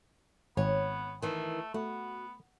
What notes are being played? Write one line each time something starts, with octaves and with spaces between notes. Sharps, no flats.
G#1 B3 C#5
D#3 E3 A3
A3 B3 F#4